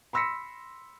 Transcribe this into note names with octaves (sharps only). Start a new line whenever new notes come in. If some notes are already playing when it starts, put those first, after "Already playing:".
B5 C6 E6 A#6 B6 C#7